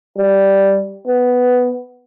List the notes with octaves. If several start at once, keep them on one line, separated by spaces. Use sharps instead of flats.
G3
B3